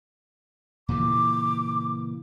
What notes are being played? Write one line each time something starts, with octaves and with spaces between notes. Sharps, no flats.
A#2 C#3 E3 D6